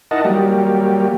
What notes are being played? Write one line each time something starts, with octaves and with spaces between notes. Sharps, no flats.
D#4 E4 A#4 D#5 F#5 A5
F#3 G3 A#3 G4